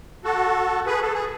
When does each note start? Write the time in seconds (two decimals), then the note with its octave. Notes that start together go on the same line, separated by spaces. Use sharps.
0.24 F#4 A4
0.86 G#4 B4
1.02 A4
1.13 G#4